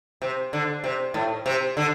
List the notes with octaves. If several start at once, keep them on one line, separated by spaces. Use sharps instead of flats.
C3
D3
C3
A2
C3
D3